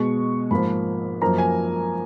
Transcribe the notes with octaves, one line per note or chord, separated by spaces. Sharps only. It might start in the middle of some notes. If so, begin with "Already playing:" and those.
Already playing: B2 G#3 C#6
G#2 F3 A#3 B5
F#2 F3 A#3 A#5
G#5